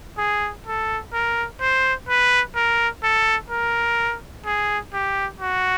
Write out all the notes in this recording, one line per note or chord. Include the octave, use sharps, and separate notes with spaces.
G#4
A4
A#4
C5
B4
A#4
A4
A#4
G#4
G4
F#4